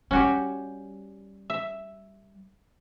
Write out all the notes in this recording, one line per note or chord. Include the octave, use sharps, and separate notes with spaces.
G3 C#4 F#4 G4
E5